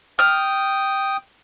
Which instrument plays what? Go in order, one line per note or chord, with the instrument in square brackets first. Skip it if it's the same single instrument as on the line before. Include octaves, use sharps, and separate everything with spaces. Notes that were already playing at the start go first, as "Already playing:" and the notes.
[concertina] G5 D#6 [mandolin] F6